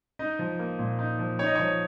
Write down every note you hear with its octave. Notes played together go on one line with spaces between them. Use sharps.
D#4 D#5
F3
A#3
A#2
D#4
F3
D#4 C#5
D#5
F3 C#5